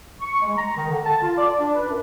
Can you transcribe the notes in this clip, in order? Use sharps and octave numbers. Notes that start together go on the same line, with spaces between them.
C#6
G#3
A#5
D#3
D3
A5
F4
D5
D4
B4
F#2